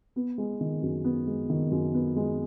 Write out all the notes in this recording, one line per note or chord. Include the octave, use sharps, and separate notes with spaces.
B3
G#3
D#3
F#2
B3
G#3
D#3
F#2
B3
G#3